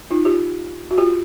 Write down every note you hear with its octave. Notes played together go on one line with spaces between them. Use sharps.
D#4 F4
F4 G4
F#4
F4 G4